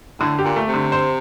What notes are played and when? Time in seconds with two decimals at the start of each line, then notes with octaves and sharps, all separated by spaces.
0.20 A2 D3
0.39 G4
0.44 A#2
0.56 A3
0.68 C3
0.74 D3
0.92 C5